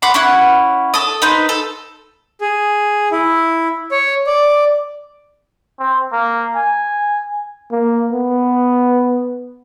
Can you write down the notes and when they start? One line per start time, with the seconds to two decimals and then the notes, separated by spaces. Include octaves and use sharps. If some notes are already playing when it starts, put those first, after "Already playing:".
0.02 F#5 B5 C6 D6
0.14 C#4 E4 F#5
0.94 A4 D#6
1.22 D#4 B4 C5
1.49 A4
2.41 G#4
3.12 E4
3.91 C#5
4.27 D5
5.79 C4
6.12 A#3
6.55 G#5
7.71 A#3
8.12 B3